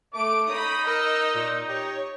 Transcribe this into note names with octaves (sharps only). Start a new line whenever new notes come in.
A3 D6 D7
D#4 C#5 B5 D#6
A#4 D#5 E6
A#2
G4 C#5